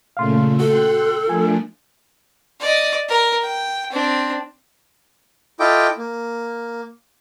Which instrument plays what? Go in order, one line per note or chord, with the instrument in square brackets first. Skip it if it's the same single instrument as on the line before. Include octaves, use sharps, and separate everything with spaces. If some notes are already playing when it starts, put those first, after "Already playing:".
[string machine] A#2 C#3 A3 [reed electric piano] F5 C6
[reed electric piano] F#4 [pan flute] A4 [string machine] G5 C6 F#6
[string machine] F3 A3 D4 [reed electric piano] F4 A#4 G#5
[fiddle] D5 D#5
A#4
G5
C4 D4
[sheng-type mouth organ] E4 F4 A4 D#5 G5 D6
A#3